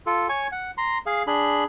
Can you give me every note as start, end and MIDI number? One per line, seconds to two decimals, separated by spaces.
0.06 0.27 65
0.06 0.27 69
0.29 0.47 73
0.29 0.47 80
0.29 0.47 85
0.52 0.71 78
0.78 0.98 82
0.78 0.98 84
1.06 1.23 68
1.06 1.23 77
1.27 1.64 62
1.27 1.64 68
1.27 1.64 83